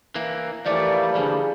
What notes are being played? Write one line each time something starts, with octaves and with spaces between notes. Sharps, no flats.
E3 A#3
E3 F3 G3 A3 A#3 D5
D3 F3 G#4